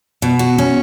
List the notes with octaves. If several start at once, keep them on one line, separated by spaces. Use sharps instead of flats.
B2
F#4
C#4